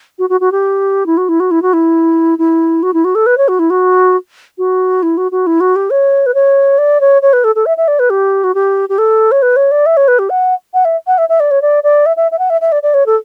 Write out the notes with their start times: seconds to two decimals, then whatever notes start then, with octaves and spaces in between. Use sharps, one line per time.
0.19 F#4
0.30 F#4
0.41 F#4
0.52 G4
1.06 E4
1.17 F#4
1.29 E4
1.40 F#4
1.51 E4
1.62 F#4
1.73 E4
2.39 E4
2.83 F#4
2.94 E4
3.05 F#4
3.15 A4
3.26 B4
3.38 C#5
3.48 F#4
3.59 E4
3.70 F#4
4.58 F#4
5.03 E4
5.17 F#4
5.32 F#4
5.47 E4
5.60 F#4
5.76 G4
5.90 C#5
6.26 B4
6.34 C#5
6.78 D5
7.01 C#5
7.22 C#5
7.33 B4
7.44 A4
7.55 A4
7.66 E5
7.77 E5
7.88 D5
7.99 B4
8.10 G4
8.44 F#4
8.55 G4
8.89 G4
8.98 A4
9.32 C#5
9.42 B4
9.56 C#5
9.71 D5
9.86 E5
9.97 C#5
10.08 B4
10.19 G4
10.30 F#5
10.74 F#5
10.85 E5
11.07 F#5
11.18 E5
11.29 E5
11.40 D5
11.51 C#5
11.62 D5
11.84 D5
12.06 E5
12.17 E5
12.32 E5
12.39 F#5
12.50 E5
12.61 E5
12.72 D5
12.83 D5
12.94 C#5
13.06 A4